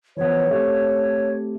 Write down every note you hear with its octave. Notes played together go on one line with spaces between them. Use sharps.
E3 F3 B3 C#5
A3 C4 G4